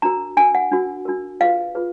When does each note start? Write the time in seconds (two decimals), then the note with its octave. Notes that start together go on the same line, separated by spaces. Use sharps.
0.02 D4 F#4 A#4 A#5
0.37 D4 F#4 A#4 G#5
0.55 F#5
0.72 D4 F#4 A#4
1.05 D4 F#4 A#4
1.40 F4 G#4 B4 F5
1.75 F4 G#4 B4